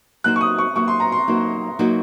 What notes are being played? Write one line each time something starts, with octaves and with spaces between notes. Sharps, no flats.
F#3 A#3 D#4 F#4 C5 F#6
C#6
D#6
C#6
F#3 A#3 D#4 F#4 C5 C#6
C6
A#5
C6
F#3 A#3 D#4 F#4 C5
F#3 A#3 D#4 F#4 C5